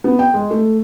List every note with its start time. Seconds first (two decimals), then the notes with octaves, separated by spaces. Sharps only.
0.04 B3
0.19 G5
0.34 G#3
0.51 A3